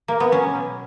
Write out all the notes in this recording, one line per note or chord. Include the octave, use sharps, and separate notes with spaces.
A#3
B3
F#3 C#4
B2